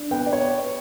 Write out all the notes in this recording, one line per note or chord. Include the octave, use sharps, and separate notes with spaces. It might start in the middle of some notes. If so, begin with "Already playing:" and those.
Already playing: D4
B3 G5
D5
B3 C#5